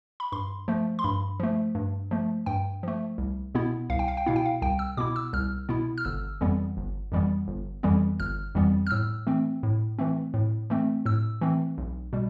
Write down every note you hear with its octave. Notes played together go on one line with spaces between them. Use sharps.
B5
G2 C6
F3 A3
C6
G2 B5
F3 A3
G2
F3 A3
G2 G5
F3 A3
C2
B2 B3 E4
C2 F5
G5
F5
G5
B2 B3 E4 F5
G5
F5
C2 G5
E6
B2 B3 E4 D6
E6
C2 F6
B2 B3 E4
F6
G1 E6
F2 E3 G3 B3
G1
F2 E3 G3 B3
G1
F2 E3 G3 B3
G1 F6
F2 E3 G3 B3
F6
A2 E6
E3 A3 C4
A2
E3 A3 C4
A2
E3 A3 C4
A2 E6
E3 A3 C4
B1
B2 G3